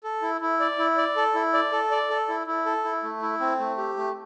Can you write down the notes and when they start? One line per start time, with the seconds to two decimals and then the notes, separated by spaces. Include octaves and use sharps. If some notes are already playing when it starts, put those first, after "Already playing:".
0.04 A4
0.22 E4
0.41 E4
0.60 D5
0.79 E4
0.97 D5
1.16 A4
1.34 E4
1.53 D5
1.72 A4
1.91 D5
2.10 A4
2.28 E4
2.47 E4
2.66 A4
2.84 E4
3.03 A3
3.22 E4
3.40 C4
3.59 A3
3.78 G4
3.97 A3